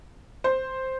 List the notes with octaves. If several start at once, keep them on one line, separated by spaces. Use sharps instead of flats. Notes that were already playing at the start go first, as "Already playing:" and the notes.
C5